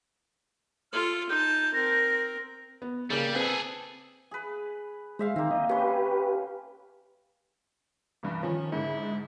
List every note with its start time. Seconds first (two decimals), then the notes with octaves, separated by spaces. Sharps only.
0.92 F4 A4 F6
1.30 D#4 A5 G6
1.74 C4 A#4 A#6
2.82 B3
3.10 C#3 G3 A#3
3.35 C4 G#4 A4 B4
4.31 G#4 B4
5.19 G#3 C5 E5 F5
5.36 D#3 A#3 C4
5.51 D#5
5.69 C#4 G4 B4 C6
8.23 C2 G2 E3
8.43 D#3 F3 C#4
8.72 G#2 D3 E4
8.96 G#3